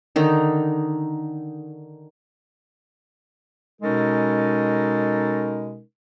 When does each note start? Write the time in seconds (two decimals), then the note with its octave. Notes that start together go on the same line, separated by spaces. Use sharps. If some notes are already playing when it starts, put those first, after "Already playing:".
0.16 D3 D#3 D#4
3.82 B2 G#3 C#4 D#4 A4 A#4